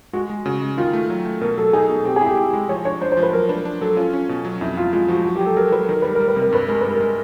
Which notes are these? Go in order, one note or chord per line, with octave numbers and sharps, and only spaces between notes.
G#3 F#4
G#3
C#3 F#4
G#3
D#3 F4
A3
F#3
A3
B2 A#4
F#3 A4
D#4 G#4
B2
C4 G4
E4 G#4
G4
E4
G#3
F3 C#5
D4 C#5
D4 C5
C5
F3
B4
F#3 A#4
D4 B4
D4
F#3 A4
C#4 F4
C#4
B2
F#3
F2 E4
F2 F4
G#3 F4
F3 F#4
F#3 F#4
G4
F#3
A4
F#3 A#4
F#3 B4
D#3 A#4
G3 B4
G3 A#4
B4
C3
A#4
G2 B4
G#3 A#4
G2 B4
A#4
G#3